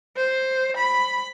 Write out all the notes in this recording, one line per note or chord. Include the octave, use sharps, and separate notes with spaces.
C5
B5